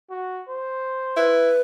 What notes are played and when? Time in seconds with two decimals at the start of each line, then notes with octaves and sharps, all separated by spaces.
0.10 F#4
0.48 C5
1.17 E4 B4